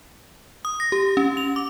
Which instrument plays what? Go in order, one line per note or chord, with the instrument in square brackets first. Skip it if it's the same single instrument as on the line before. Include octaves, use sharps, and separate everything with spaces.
[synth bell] D#6
A#6
G4
C#4
F7
D6